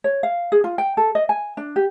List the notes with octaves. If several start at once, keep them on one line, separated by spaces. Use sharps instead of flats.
C#5
F5
G#4
F4
G5
A4
D#5
G#5
D4
G4